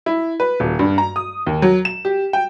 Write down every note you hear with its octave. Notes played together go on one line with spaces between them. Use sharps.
E4
B4
D#1
G2
A#5
D#6
D#2
F#3
E7
G4
G5